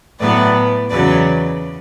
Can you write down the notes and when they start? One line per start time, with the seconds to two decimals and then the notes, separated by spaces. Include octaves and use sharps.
0.19 A2 F#3 B3 B4 D5
0.90 E2 C#3 F#3 B4 D5